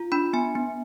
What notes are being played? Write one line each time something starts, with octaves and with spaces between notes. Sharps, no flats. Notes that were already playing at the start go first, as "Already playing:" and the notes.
Already playing: F4
D4 B5
B3 G#5
B3